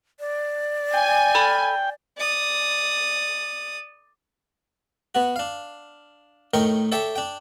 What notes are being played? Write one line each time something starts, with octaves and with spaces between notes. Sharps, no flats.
D5
G5 G#5
A4 B5 F6
D5 D#6
B3 F#4
D4 F5
A2 D#3 D#4 A#4 G5 C#6
A4 C#5 D5 E5 G5 A5
D4 G5